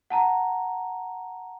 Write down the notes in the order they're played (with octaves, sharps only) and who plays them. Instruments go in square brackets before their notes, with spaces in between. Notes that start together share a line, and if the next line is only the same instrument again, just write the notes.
[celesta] F#5 A5 A#5